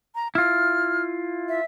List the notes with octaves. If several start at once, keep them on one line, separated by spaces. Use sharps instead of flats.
A#5
E4 F4 F6
E5